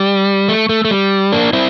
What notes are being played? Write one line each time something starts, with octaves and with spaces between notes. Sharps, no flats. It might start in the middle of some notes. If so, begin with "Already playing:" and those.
Already playing: G3
A3
A3
A3
G3
A#3 D4
C4 E4